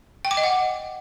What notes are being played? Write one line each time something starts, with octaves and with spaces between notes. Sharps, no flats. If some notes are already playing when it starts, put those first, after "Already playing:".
G5
D6
D#5
F#5